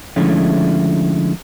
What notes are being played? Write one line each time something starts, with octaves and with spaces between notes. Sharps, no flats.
D3 F3 G#3 A3 C#4 E4